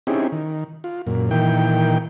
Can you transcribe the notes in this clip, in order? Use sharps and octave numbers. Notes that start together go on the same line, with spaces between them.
C4 C#4 D#4 E4 G4 G#4
D#3
F4
F#2 A#2
A#2 D#3 E3 G5